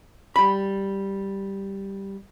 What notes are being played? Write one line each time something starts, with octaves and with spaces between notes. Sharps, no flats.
G3 B5